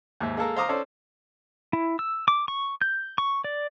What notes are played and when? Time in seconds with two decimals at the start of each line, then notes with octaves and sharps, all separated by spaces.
0.20 D#2 G#2 E5
0.37 G#3 A#3 A4 A#4
0.57 C5 F5 A#5 D6 D#6
0.69 C#4 A4 C5 D5
1.73 E4
1.99 E6
2.28 D6
2.48 C#6
2.82 G6
3.18 C#6
3.44 D5